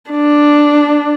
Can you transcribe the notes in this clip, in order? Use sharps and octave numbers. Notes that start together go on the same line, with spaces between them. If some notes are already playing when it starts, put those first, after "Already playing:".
D4